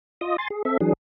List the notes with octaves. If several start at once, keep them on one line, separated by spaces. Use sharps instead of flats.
F4 D#5 D#6
G#5 C6 A6
G#4
C4 A4 E5
E3 F#3 D4 G#4